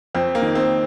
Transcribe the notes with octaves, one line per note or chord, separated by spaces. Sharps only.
F2 C4
A#3
D#3
C4